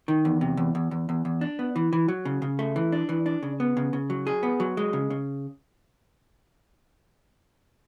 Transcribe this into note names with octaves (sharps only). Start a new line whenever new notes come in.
D#3
E2
C3
E2
E2
E2
E2
E2
D4
B3
E3
E3
F#3
C#3
C#3
A3
E3
D4
E3
D4
C#3
B3
C#3
C#3
F#3
G#4
B3
F#3
G#3
C#3
C#3